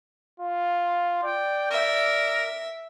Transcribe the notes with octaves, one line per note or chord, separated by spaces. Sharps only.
F4
D5 G5
A#4 E5